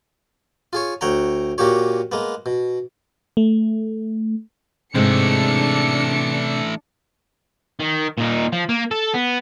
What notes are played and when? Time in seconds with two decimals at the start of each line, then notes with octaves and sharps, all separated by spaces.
0.73 F4 G#4 C#5
1.01 D2 C#5 F#5 G5 A#5
1.58 A#2 A#3 F#4 G4 C#5
2.12 G#3 A#3 B3
2.46 B2
3.37 A3
4.95 G#2 C3 E3 G#3 A3 D4 D#4 C#7
7.80 D#3
8.18 A#2 D#4
8.53 F3
8.69 A#3
8.91 A4
9.14 B3